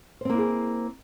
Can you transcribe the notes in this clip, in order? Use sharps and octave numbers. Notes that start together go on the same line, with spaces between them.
A#3 C4 E4 G#4 C5